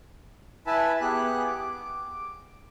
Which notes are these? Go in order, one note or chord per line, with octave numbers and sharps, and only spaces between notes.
E4 B4 E5 G#5 A5
B3 G4 G#4 F#6
D6